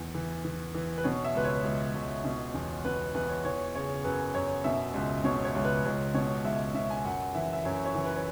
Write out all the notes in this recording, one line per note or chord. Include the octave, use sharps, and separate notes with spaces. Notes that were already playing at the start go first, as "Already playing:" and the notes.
Already playing: E2 E3
E3
E3
E3
B4
B2 C#5
E5
C#2 B4
C#5
C#2
C#2
B2
E2
B2 B4
E2 B4
C#5
E3 C#5
C#3 C#5
F#2 B4
F#2 C#5
B2 E5
C#2
B2 C#5
C#5
C#2
B4
C#2 C#5
B2 C#5
C#2 E5
B2 E5
G#5
F#2 F#5
E3 E5
E5
F#2 C#5
C#5
E3
B4
C#5